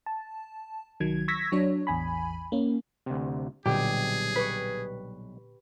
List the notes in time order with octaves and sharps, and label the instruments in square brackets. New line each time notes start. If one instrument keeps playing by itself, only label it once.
[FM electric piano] A5
C2 D#3 F#3 G#6
C#6 E6 G#6 A#6 B6
F#3 D4 C#5
A1 E2 G#5 B5
A#3 C#4
[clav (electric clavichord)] D2 C3
[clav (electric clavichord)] B1 G3 [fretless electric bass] A#2 D3 [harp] G4 [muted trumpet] G#4
[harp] B4 C#6